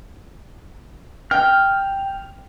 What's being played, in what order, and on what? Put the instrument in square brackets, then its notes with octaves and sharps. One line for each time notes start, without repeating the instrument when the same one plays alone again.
[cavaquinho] G5 [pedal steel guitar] F6